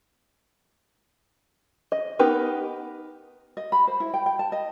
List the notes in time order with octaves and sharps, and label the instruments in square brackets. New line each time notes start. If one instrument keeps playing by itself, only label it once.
[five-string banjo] D#5
B3 D#4 G4 A#4 B4
[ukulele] D#5
B5
C5
E4
G5
G5
A5
D#5